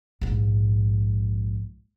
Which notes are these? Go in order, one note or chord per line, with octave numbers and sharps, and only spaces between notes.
A#1 G#2